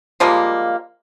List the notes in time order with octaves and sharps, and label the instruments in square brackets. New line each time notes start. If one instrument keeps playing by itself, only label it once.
[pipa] F3 G3 G#3 A#3